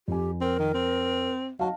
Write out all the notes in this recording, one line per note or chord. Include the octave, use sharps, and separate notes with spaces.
F2 G4 G#5
C4 A#4
D#3
C4
F#3 D#5 F5 A5